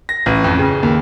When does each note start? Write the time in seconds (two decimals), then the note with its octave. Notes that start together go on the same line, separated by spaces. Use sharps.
0.09 A#6
0.26 A1
0.44 F2
0.59 C#3
0.83 D#2